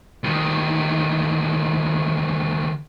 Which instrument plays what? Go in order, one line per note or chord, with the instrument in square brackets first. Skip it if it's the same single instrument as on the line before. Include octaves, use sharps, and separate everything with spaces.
[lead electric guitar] D2 D#3